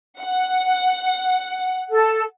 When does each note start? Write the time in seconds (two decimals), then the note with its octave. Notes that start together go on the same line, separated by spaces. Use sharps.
0.19 F#5
1.91 A4